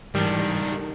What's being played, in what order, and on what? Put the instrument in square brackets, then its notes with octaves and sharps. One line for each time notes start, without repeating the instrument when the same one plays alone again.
[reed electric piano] G#2 E3 G6 [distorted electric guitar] D#3 D4 [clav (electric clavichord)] G3